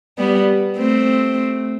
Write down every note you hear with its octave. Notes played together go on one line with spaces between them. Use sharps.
G3 B3
A3 C4